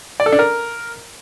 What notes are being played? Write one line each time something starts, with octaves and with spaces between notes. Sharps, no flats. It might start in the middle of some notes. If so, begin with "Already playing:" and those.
D5
A4
D4
A#4